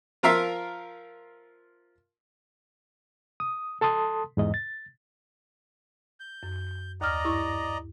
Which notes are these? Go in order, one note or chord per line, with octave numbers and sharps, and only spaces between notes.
F3 F4 A#4 E5 F5 E6
D#6
A4 A5 C6 D#6
E2 G#2 D#5
A6
G6
F#2
D#2 D5 D#5 A#5 F6
G2 E4 C#6